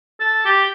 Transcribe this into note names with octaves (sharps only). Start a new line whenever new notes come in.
A4
G4